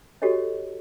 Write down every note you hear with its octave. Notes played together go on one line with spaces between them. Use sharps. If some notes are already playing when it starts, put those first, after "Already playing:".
F#4 G4 A4 C#5 D#5